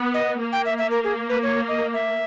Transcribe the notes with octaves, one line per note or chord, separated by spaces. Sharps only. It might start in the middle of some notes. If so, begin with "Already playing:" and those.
Already playing: B3
D#5
A#3
G5
E5
E5
A#4
G#4
B4
C#5
D#5
E5